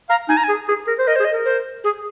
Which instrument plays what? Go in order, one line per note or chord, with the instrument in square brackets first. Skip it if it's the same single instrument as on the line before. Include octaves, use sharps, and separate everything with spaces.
[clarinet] F5 [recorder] A#5
[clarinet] D#4 [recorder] G#5
[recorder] A#5
G#5
[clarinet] G#4
G#4
A#4
C5
[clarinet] A#4 [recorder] D#5
[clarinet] G#4 [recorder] C5
[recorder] D#5
[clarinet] A#4
[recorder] C5
G#4